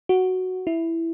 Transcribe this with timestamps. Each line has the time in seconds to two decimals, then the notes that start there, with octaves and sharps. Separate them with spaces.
0.09 F#4
0.67 E4